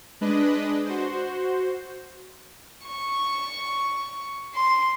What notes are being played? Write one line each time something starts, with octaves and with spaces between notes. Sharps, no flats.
G#3 D4 B4 D#5
F#4 C5
C#6
C6